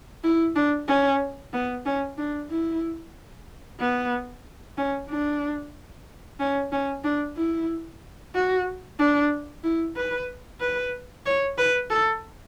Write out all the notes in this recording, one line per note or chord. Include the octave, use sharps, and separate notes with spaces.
E4
D4
C#4
B3
C#4
D4
E4
B3
C#4
D4
C#4
C#4
D4
E4
F#4
D4
E4
B4
B4
C#5
B4
A4